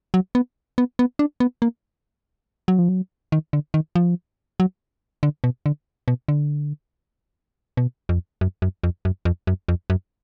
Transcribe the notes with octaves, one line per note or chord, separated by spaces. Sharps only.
F#3
B3
B3
B3
D4
B3
A#3
F#3
F3
F#3
D#3
D3
D#3
F3
F#3
D3
B2
D3
B2
D3
B2
F2
F#2
F#2
F2
F#2
F2
F#2
F2
F#2